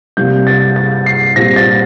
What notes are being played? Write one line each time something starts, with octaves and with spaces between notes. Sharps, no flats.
C3 G3 A#3 G6
A6
A6
C7
A#2 G3 C4 A#6
A6